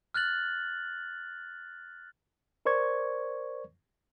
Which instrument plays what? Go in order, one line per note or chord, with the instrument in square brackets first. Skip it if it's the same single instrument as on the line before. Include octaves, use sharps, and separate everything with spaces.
[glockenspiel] F6 F#6 A6 F#7
[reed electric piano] A#4 C5 D5 C#6 G#6